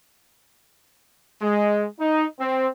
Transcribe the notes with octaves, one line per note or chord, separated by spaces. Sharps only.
G#3
D#4
C4